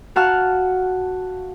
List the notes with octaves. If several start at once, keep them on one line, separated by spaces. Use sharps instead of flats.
F#4 F5 F#5 A5 F6